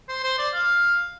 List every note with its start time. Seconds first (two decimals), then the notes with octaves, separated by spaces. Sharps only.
0.09 C5
0.24 C5
0.38 D5
0.54 F5